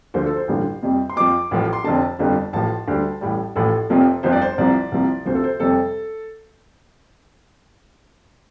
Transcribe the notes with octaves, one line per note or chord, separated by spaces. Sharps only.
D2 D3 F3 C5
A4
C5
A1 G2 D3 F3
F2 C3 G3
C6
F2 F3 D6
A1 A2 F3
C6
F1 F2 D3 A5
G1 F2 D3 G3
A1 A2 F3 A5
D2 D3 G3
A1 A2 G3
A1 A2 F3 A4
F1 F2 C3 F3
G1 F2 F3 C5
D5
C5
C5
C2 C3 F3 D5
C2 C3 F3
D2 C3 F3 C5
A4
C5
F1 F2 C3 G3 A4